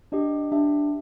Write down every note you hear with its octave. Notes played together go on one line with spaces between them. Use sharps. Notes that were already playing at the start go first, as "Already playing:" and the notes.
D4 G4 D#5
D4 G4 E5